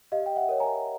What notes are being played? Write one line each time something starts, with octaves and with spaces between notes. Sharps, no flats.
G4 D#5 F5
G5
E5 F#5
A#4 C#5
G#5 A#5